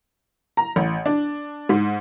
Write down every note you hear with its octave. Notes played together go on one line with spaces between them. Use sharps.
A#5
A1
D4
G#2